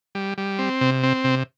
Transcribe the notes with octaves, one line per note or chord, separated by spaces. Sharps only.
G3
G3
C4
C3
C4
C3